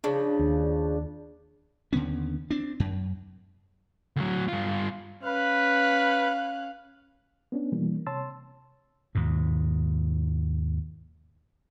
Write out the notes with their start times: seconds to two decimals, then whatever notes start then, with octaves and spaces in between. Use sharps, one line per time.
0.04 C#3 F3 D4
0.39 D#2
1.93 D#2 D3 B3 C#4
2.50 C4 D4
2.80 F#2
4.16 D2 F#3
4.48 G2 F4
5.24 C#4 B4 F5 F#6
7.52 B3 C#4 D4
7.72 B2 E3 G3 A#3
8.07 C3 C#5 A5 C6 E6 A6
9.15 D#2 G#2 B2